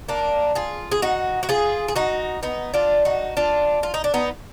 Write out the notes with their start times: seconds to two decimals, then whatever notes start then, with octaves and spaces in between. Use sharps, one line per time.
0.08 A#3 D4
0.55 F4 G#4
0.92 G#4
1.02 D#4 F#4
1.43 F#4
1.49 F4 G#4
1.88 G#4
1.96 D#4 F#4
2.43 B3 D#4
2.74 D4 F4
3.05 D#4 F#4
3.37 D4 F4
3.83 F4
3.94 D#4
4.04 D4
4.14 B3 D#4